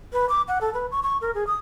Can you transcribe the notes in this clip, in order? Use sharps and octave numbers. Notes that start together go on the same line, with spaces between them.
B4
D6
F#5
A4
B4
C#6
C#6
A#4
G#4
D#6